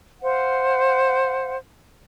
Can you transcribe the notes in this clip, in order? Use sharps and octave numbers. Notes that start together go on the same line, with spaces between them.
C5 F5 F#5